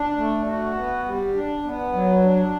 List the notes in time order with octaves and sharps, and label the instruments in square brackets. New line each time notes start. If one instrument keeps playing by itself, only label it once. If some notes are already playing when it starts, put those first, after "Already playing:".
Already playing: [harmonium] D4
A3
F#4
B3
G3
D4
B3
F#3
D4